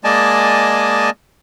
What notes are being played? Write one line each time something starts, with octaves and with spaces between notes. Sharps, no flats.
G#3 A#3 D5 D#5 G#5 A5